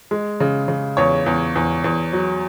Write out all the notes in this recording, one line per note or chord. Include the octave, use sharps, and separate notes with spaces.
G#3
C#3
C#3
E2 C#5
E2
E2
E2
F#3